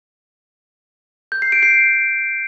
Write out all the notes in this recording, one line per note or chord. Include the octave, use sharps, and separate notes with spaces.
G6
C7
D7
C7